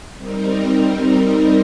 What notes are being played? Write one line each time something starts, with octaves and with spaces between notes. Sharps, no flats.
G3 C4 D#4 A#4